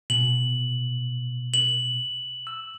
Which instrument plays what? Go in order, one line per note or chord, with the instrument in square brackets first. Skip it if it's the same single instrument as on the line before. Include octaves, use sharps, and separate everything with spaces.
[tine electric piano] B2 [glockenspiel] F#7
[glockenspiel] F#7
[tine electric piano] E6